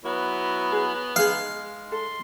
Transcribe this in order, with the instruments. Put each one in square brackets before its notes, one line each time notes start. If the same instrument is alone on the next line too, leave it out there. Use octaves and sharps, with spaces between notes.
[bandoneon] F#3 E4 F#4 [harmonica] B3
[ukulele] G#4
[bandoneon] G#3 [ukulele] D#4 G#4 [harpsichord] F5
[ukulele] A4 [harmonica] C6